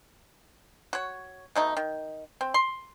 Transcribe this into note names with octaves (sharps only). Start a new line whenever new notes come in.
F#4 C#5
B2 A3 D#4
D#3
C4
C6